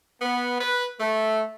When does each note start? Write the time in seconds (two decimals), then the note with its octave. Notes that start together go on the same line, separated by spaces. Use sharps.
0.22 B3
0.60 B4
1.00 A3